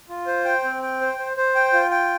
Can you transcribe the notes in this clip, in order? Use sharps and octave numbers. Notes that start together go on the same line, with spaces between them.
F4
C5
G5
C4
G5
C5
C5
C5
G5
F4
G5